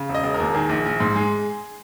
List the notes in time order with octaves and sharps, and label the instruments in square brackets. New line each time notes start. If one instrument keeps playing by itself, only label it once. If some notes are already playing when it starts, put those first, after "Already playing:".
Already playing: [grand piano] C#3
E1
D#5
E1
A#4
D#2
D#3 G#4
A#1
A#1
G#2
G#3